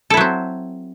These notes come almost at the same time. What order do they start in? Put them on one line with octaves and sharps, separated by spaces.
A4 E4 F#3 C4